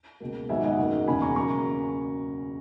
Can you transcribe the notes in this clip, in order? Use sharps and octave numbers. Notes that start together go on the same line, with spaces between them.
C#2 B2 A#3
G#1 G#2 D#3 F#3 B3 E5 G#5
D#5 F#5
F#1 F#2 D#3 F#3 A#3
E1 E2 C#3 G#5 B5
A#5 C#6
C#3 F#3 A#3 A#5 C#6